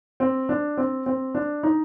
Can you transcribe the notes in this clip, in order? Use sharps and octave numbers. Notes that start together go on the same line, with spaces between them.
C4
D4
C4
C4
D4
D#4